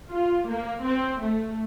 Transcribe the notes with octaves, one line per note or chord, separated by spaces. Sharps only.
F4
A#3
C4
A3